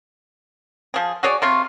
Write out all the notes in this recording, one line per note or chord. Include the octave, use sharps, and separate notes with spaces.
F3 G#4
F#4 G#4 C#5 D5
C3 F4 C#6